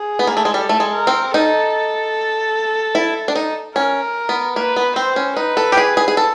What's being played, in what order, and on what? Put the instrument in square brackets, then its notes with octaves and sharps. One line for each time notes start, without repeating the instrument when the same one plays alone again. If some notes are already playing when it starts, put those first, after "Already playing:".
Already playing: [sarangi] G#4
[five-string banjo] B3
A#3
A3
G#3
[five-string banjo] G3 [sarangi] A4
[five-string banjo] A3
G#3
[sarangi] A#4
[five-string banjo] C4
[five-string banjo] D#4 [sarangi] A4
[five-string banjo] E4
D4
D#4
[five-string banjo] C#4 [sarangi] A#4
[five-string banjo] B3
[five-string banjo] A#3 [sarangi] B4
[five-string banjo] B3
[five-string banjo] C4 [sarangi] C5
[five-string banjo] C#4
[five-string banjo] D#4 [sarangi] B4
[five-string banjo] A4
G4
G#4
G#4
G#4
A4